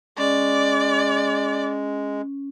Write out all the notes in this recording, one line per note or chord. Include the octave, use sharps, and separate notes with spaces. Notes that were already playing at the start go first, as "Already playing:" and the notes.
G#3 C#4 D5